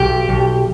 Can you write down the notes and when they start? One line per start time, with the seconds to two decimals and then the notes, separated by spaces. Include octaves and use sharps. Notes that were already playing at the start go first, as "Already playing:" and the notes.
Already playing: B1 G4
0.29 B1